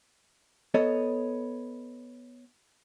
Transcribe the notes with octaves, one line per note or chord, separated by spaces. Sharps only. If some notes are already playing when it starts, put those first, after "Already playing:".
B3 A4 C#5 D#5